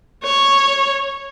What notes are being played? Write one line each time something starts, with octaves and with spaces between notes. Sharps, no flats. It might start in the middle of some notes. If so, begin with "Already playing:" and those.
C#5